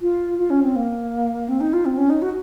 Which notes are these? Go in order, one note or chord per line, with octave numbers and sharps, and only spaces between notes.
F4
F4
C#4
C4
A#3
C4
D#4
F4
C4
C#4
D#4
F#4